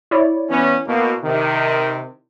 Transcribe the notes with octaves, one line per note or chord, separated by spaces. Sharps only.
E4 C#5 D5
E3 B3 C#4
B2 A#3
C3 D#3